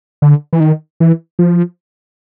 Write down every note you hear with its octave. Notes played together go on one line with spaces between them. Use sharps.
D3
E3
D#3
E3
F3